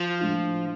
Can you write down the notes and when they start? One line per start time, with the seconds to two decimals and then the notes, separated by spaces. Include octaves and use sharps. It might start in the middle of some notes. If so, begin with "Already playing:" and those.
Already playing: F3
0.19 A2 G#3 D4 F4